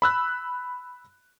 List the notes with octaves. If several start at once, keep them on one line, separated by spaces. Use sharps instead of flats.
B5 E6 F#6